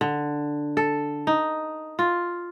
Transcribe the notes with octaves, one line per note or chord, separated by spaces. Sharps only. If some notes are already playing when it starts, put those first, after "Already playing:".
D3
A4
D#4
F4